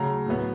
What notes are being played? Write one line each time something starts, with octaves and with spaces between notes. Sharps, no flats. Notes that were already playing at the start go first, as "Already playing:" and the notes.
Already playing: C#3 F#3 A3 A#5
A2 F#3 B3